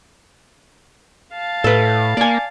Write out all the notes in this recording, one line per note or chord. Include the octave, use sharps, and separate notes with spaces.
F5 A5
A2 A4 B4
A#3 D5 G#5